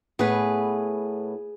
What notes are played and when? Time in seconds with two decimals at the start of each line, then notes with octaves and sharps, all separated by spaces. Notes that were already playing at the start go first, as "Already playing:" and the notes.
0.19 A2 B3 G#4 B4